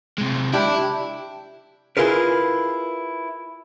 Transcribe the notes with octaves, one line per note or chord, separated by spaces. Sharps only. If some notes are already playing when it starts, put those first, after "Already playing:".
C3 G#3
D4 E4 G4
E4 F4 G#4 A#4 B4